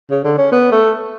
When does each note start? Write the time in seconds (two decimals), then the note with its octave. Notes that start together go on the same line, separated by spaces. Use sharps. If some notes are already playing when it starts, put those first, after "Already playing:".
0.11 C#3
0.24 D3
0.38 C#4
0.52 B3
0.72 A3